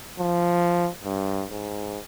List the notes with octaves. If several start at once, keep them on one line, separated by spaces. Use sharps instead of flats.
F3
G2
G#2